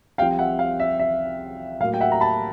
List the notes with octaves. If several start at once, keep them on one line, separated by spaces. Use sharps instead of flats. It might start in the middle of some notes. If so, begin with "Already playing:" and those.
C2 C3 F3 F5 G5
E5 F#5
F5
E5
E5
A2 F#3 A#3 F5
G5
E5 F#5
A#5
A5 B5